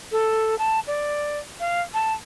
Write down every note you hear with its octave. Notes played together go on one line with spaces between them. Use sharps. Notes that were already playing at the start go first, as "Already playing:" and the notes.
A4
A5
D5
F5
A5